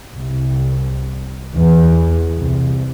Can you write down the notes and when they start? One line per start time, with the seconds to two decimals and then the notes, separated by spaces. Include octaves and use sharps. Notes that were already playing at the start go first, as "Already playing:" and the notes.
0.13 C2
1.56 E2
2.37 C2